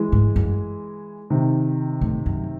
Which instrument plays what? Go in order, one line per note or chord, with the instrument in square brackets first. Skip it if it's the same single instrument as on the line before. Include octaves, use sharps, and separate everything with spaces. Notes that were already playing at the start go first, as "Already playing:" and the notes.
Already playing: [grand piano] E3 G#3
[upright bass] G#2
F#2
[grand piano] C3 D#3
[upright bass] A2
F#2